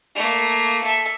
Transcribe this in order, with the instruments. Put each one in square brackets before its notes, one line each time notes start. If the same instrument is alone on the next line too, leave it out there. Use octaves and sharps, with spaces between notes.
[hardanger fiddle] A3 A#3
A4 E5